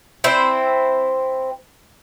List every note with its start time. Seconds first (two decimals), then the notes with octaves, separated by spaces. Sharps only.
0.24 C4 E4 C5